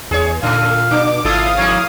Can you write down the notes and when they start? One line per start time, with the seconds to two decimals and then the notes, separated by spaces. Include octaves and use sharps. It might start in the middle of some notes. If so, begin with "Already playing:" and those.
0.11 E2 G#4 C#5
0.43 A#2 C#3 A3 F5
0.91 B2 D4 D6
1.25 G#1 A3 E4 F4 A4 F5 D#6
1.57 F2 A#3 E4 C#5